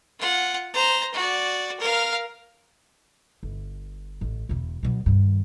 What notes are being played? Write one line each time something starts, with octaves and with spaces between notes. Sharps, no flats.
F4 F#5
C5 A#5
F#4 D5
A#4 F5
G1
A1
E1 E2
B2 F#3
G2 D#3